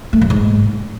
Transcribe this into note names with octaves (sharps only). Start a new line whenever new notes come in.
A3
F#2
G#2